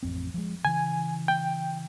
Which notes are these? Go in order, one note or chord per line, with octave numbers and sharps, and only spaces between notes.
A1 F2 C4
F3 G#3
C#3 E3 G#5
G5